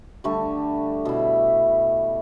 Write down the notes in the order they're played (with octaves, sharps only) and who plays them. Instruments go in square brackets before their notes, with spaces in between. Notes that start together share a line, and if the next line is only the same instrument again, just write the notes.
[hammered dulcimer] D3 G3 A3 C#6
B2 E4